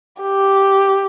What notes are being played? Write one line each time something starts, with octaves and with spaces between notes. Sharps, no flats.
G4